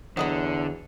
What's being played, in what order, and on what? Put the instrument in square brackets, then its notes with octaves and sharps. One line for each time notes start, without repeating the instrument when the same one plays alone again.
[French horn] E2 [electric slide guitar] D3 [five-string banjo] F#3 D#5 B5